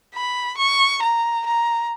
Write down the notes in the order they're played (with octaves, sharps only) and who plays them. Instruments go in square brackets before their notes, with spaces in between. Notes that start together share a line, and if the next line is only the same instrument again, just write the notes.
[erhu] B5
C#6
A#5
A#5